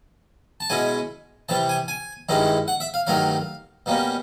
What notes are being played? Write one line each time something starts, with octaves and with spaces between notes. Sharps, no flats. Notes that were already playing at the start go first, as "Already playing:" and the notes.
A5
B2 G#3 C#4 E4 G#5
C3 E3 G3 A5
G#5
G#5
G2 D#3 G#3 C#4 E4
F#5
E5
F5
G2 D#3 F#3 A3 F5
B2 G3 A#3 C#4